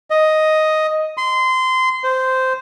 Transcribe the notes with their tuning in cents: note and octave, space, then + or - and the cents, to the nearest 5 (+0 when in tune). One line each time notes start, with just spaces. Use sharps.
D#5 +5
C6 -20
C5 -10